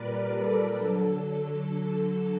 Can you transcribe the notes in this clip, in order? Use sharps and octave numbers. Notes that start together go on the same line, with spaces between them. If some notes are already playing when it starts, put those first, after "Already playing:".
Already playing: A#2 G3 A#4 B4 D5
A4
D3 F#3